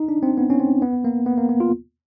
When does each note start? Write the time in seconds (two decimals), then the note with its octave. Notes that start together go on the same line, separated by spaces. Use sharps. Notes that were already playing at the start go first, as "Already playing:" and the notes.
Already playing: D#4
0.09 D4
0.23 C4
0.38 B3
0.50 C#4
0.60 C4
0.82 B3
1.05 A#3
1.26 B3
1.37 A#3
1.49 B3
1.60 F4